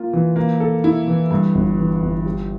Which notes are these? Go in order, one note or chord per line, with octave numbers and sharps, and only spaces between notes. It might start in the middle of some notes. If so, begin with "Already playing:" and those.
Already playing: A#3 F4 A#4
E3
A#3
A4
E4
E3
G2
G1
E3
G1
G3